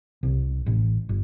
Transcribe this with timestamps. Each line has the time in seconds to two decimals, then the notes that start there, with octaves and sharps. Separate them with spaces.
0.23 C2
0.66 A1
1.09 G1